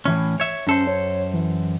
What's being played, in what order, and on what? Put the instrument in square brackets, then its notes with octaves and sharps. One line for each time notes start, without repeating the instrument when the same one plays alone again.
[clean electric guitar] A2 E3 C#4
C#5 E5
[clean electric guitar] F#2 A4 C5 [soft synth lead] C#4
[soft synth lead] C#5
E3